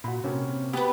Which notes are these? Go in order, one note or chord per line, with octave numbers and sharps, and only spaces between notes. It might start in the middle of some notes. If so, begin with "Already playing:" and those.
A#2 F#4 B5
C3 A#3 C#4
B3 G4 B4